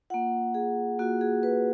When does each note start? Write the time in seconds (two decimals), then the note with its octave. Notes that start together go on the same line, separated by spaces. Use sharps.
0.10 A#3 F4 F#5
0.54 G#4
0.99 A#3 F4 F#4
1.21 G#4
1.43 B4